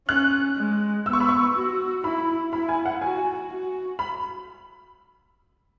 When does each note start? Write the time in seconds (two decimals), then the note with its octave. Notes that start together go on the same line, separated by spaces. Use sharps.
0.08 C#4 F#6
0.57 G#3
1.06 B3 E6
1.13 C#6
1.20 B5
1.29 C#6
1.55 F#4
2.03 E4 B5
2.53 E4 B5
2.69 G#5
2.86 F#5
3.02 F#4 G#5
3.51 F#4
3.99 B5